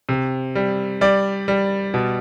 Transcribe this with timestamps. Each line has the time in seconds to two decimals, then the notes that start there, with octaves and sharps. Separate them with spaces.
0.09 C3
0.55 G3
1.01 G3 D5
1.48 G3
1.94 B2